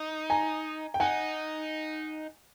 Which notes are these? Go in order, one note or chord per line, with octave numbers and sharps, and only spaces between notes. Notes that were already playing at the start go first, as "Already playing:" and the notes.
Already playing: D#4
G#5 A#5
G5
D#4 F#5 G#5